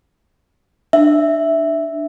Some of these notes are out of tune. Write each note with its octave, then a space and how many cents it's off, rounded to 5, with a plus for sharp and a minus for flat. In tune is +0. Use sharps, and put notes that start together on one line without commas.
D4 +20 E5 +0